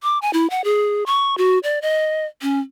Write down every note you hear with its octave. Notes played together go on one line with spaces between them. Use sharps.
D6
G#5
E4
F#5
G#4
C#6
F#4
D5
D#5
C#4